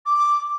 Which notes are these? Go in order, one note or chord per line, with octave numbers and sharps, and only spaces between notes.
D6